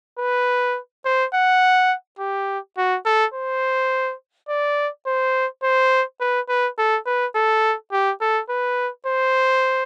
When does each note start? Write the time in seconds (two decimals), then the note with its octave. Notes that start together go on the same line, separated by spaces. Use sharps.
0.19 B4
1.05 C5
1.34 F#5
2.19 G4
2.77 F#4
3.05 A4
3.34 C5
4.49 D5
5.07 C5
5.63 C5
6.20 B4
6.49 B4
6.78 A4
7.06 B4
7.35 A4
7.92 G4
8.21 A4
8.49 B4
9.06 C5